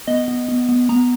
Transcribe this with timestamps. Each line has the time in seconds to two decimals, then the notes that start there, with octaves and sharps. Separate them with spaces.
0.07 B3 D#5
0.28 B3
0.48 B3
0.69 B3
0.89 B3 A#5